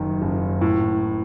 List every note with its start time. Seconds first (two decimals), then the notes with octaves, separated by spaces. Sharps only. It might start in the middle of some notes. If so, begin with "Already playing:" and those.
Already playing: F#1 F#2 D#3
0.22 F#1
0.61 A2